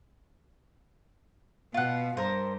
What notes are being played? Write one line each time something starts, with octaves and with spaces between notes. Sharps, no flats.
B2 F4 F#5
G2 A#4 C5